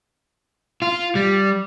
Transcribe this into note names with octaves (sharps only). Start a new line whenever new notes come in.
F4
G3